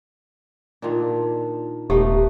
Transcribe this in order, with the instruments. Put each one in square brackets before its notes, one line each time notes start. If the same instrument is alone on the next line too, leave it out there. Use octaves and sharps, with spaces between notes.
[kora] A#2 D#3 D4
[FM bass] D#1 [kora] A3 B3 D#4 [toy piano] G4